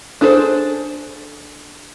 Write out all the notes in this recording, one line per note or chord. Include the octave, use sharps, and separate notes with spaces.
D4 G#4 A4 B4 C5